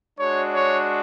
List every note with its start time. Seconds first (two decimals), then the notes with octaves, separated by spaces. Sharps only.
0.18 G#3 D4 F#4 C#5
0.54 C#5